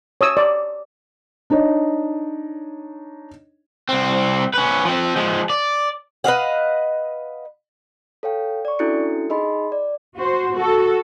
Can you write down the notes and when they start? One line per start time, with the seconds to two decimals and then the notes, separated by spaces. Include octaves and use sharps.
0.21 C#5 D#6 E6
0.37 D5
1.50 D4 D#4 C#5 D#5
3.89 C2 C4
4.54 C#4 B4
4.85 F3 C4
5.16 F3 G#3
5.50 D5
6.24 B4 D#5 F5 F#5
8.23 A4 C#5 F5 G5
8.65 D5 C#6
8.79 C#4 D4 E4 F#4 A4 C#7
9.30 D#4 G#4 D#5 B5 C6
9.72 D5
10.17 F#4 C5
10.54 F#4 A4